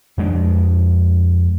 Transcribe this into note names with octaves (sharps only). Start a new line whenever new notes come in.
F2 G#3 D4